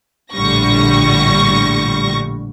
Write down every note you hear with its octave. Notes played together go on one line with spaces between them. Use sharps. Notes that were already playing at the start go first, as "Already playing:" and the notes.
A#1 A2 D3 G3 C#6 A#6